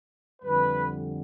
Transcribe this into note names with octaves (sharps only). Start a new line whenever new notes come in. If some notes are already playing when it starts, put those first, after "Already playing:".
F2 D3 G3 B4